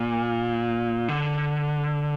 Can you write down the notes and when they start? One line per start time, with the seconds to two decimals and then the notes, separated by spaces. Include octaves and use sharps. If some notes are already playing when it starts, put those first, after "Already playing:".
Already playing: A#2
1.08 D3